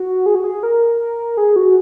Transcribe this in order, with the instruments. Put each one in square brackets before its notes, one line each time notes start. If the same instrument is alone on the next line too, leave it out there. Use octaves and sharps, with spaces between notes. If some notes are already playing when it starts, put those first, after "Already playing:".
Already playing: [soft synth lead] F#4
G#4
F#4
G#4
A#4
G#4
F#4